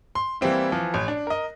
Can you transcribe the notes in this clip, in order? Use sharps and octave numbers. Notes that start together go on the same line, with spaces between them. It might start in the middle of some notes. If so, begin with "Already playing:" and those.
C6
E3 G3 A#3 C4 E4
E3 F3
A1
D4
A#4 D#5